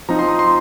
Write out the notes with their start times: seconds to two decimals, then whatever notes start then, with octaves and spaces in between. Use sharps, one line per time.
0.09 F3 C4 D#4 A#5
0.19 C6
0.29 D#6
0.39 C6